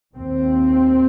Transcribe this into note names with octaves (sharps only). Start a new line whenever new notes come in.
D#2 C4